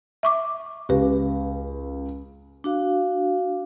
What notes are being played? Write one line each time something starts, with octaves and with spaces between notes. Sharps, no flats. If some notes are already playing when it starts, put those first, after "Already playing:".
E5 C#6 D6
C#2 G4 B4
D4 F#4 F5